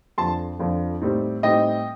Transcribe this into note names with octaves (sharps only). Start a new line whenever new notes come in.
F2 D3 F3 A5 C6
F2 D3 F3
A2 G3 C4 D#4
A2 G3 C4 D#4 D#5 G5